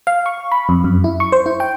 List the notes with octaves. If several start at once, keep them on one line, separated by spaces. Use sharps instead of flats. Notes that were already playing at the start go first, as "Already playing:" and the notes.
F5
C#6
B5
F2
F#2
E4
C#6
C5
E4
G5